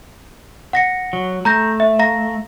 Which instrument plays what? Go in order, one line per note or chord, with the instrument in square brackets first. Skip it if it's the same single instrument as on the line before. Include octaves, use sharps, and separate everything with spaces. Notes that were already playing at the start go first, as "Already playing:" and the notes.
[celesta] F#5 A#6 C#7
[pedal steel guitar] F#3
[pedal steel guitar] A3 [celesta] A#5 G6 A#6
[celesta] E5
F5 A#5 A#6